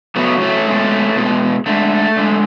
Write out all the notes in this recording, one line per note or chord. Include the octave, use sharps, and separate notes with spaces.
C#3 F#3 A3 B3
A3 C#4
B2 G#3
B2 G#3
D3 G#3 A3
D3 G#3